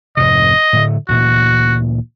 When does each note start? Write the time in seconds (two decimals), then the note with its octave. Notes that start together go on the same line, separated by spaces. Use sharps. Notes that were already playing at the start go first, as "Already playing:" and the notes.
0.17 F1 G#2 C3 D#5
0.73 A2 D3 A3
1.09 D2 A#2 E3 F#4